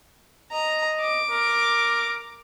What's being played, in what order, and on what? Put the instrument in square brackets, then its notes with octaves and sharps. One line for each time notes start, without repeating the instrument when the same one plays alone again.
[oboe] D#5 [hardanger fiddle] A#5
[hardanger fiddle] D6
[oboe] A#4